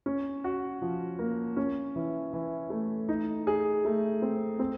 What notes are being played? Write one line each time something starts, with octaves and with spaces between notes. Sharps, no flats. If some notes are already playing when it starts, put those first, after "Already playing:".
C#4
F#4
F3
A#3
C#4
E3
E3
A3
D#4
G#4
A3
C4
C4